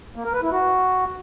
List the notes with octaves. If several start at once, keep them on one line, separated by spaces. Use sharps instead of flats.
A#3
A#4
B4
E4
F#4